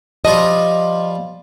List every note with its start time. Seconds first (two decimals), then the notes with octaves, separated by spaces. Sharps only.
0.25 F3 G3 F4 D#5